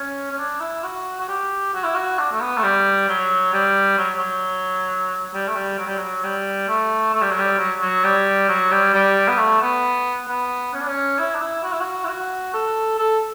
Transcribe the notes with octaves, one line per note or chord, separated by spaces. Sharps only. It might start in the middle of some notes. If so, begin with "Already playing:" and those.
Already playing: C#4
C#4
D4
E4
F#4
F#4
G4
F#4
E4
F#4
D4
A3
B3
A3
G3
F#3
G3
F#3
F#3
G3
A3
G3
F#3
G3
F#3
G3
A3
A3
G3
F#3
G3
F#3
F#3
G3
F#3
G3
G3
B3
A3
B3
B3
C#4
D4
C#4
E4
D4
E4
F#4
E4
F#4
E4
F#4
A4
A4